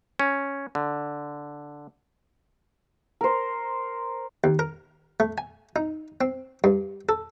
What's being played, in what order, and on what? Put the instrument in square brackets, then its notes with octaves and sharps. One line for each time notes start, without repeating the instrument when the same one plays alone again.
[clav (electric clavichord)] C#4
D3
[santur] A#4 C5
[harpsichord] D#2
A#4
A3
G#5
D#4
C4
G2
A4